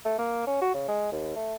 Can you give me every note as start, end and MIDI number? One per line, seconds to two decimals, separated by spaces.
0.05 0.15 57
0.19 0.44 58
0.47 0.60 61
0.62 0.73 66
0.74 0.85 49
0.89 1.12 56
1.12 1.33 39
1.36 1.55 57